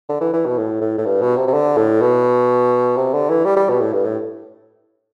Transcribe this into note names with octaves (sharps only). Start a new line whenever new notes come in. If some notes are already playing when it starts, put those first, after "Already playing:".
D3
E3
E3
B2
A2
A2
A2
G2
B2
C3
C3
D3
A2
B2
C3
D3
E3
G3
G3
B2
A2
G2
A2